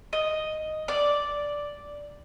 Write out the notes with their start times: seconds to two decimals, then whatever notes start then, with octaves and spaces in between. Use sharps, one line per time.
0.13 D#5
0.88 D5